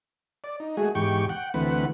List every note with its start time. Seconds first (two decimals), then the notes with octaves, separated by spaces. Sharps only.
0.44 D5
0.60 D#4
0.77 G#3 A3 F#4 G#4
0.95 E2 G#2 G4 G5 C#6
1.29 F#5 G5
1.54 D2 E3 A3 C4 B4 F#5